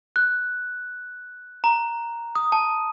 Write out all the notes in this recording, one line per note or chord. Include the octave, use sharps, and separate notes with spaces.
F#6
A#5
D#6
A5